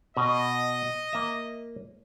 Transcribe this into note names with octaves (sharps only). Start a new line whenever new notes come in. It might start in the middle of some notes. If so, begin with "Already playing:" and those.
B2 D#5
A#3 E5